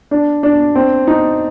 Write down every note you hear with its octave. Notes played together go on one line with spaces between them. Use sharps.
D4
D4
C4
D#4